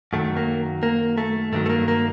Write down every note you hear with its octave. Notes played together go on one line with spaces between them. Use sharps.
F#2 D#3 F#3 A3
A#3
A#3
A3
G2 D#3 F#3 A3
A3
A#3
A#3